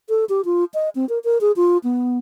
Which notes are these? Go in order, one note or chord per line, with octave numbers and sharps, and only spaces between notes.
A4
G4
F4
D#5
C4
A#4
A#4
G#4
F4
B3